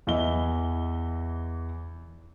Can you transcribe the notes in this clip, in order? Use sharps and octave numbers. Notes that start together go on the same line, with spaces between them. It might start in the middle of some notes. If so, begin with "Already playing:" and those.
E2 E3 D#5 E5 G7